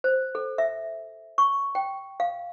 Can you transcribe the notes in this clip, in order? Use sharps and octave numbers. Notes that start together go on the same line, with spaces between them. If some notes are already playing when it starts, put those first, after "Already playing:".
C5
A4
E5
C#6
G5
F5